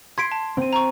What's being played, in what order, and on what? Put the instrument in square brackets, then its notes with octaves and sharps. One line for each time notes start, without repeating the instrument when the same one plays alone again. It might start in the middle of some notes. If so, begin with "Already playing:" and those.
[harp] C6 [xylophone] G#6 B6 D7
[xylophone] A5
[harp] C4 D#7
[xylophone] A#5 C#6